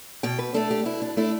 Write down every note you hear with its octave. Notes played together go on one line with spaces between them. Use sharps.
B2 G5
B4
A3 D4 A4
G4
B2 E4
D4
A3 D4 E4